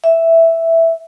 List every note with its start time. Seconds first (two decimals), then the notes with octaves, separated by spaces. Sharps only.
0.04 E5